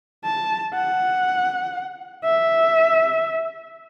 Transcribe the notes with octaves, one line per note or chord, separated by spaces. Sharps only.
A5
F#5
E5